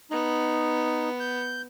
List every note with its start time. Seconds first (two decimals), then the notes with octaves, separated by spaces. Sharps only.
0.11 B3 D#4
1.20 G6